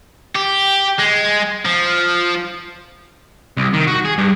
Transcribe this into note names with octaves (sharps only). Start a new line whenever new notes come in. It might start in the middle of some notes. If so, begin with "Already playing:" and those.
G4
G#3
F3
C2
D#3
F#4
G#4
G2